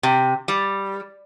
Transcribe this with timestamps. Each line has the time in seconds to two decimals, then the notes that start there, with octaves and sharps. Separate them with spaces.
0.03 C3
0.48 G3